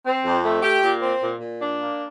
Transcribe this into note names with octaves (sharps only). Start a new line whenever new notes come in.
C4
F2
A3
G4
A#2
C4
A#2
A#2
D4
A#3